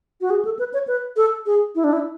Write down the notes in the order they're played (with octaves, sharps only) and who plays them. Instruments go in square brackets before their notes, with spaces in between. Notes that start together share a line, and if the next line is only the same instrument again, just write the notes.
[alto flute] F#4
G#4
A4
B4
C#5
B4
A4
G#4
E4
D4
E4